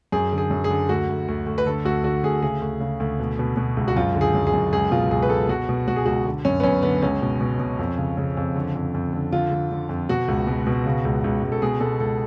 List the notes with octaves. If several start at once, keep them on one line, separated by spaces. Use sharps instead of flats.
F#2 G#4
D3
G#4
F#2
G#4
D3
D2 F#4
D2
D2
D2
B4
D3 A4
D2 F#4
D3 F#4
D2 G#4
C#3 G#4
D2
C#3
D2
B2
B2
B2
C#2
F#4
F#2 F4
D3
G#4
F#2
G#4
F#2
C#2 G#4
B2 F4
C#2 G#4
B4
C#2 A4
B2 F#4
B2
B2 F#4
G#4
C#2 F#4
D3
F#2 C#4
B3
F#2 C#4
D3 B3
C#2 C#4
B2
B2
B2
F2
C#3
C#3
F2
D3
F2
F2
D3
D3 F4
D3
D3
F2
B2 F#4
C#2
B2
B2
C#3
C#2
C#2
C#2
A4
B2 G#4
B2 A4
C#2 A4